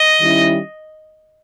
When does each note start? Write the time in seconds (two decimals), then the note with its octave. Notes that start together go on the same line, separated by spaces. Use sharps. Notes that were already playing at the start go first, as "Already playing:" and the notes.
Already playing: D#5
0.21 D#3 G3 C#4 E4